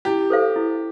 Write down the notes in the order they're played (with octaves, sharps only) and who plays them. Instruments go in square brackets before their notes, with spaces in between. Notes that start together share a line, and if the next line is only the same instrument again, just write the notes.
[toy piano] E4 [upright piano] G4
[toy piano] A4 C5 F5
E4